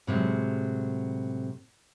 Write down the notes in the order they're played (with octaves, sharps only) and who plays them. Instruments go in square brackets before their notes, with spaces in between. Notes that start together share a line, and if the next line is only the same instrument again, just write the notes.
[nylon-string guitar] A2 C3 F#3 G#3